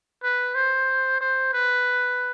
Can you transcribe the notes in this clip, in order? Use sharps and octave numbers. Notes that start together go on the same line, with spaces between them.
B4
C5
C5
B4